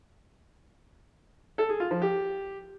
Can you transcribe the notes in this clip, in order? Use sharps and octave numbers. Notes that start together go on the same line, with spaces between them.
A4
G#4
F4
F3
G4